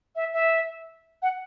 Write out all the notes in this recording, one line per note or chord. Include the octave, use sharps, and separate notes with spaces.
E5
E5
F#5